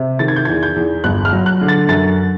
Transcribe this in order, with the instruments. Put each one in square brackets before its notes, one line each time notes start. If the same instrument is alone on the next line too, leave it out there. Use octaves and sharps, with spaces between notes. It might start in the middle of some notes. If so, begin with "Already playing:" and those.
Already playing: [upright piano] C3
D#3 A6
G#6
G6
E2 G#6
G6
E2
G1 F#6
F6
F#3
F#6
D3
A6
F#2 A6